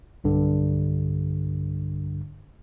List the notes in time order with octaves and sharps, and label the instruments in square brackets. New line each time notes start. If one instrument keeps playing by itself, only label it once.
[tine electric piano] B1 G2 D3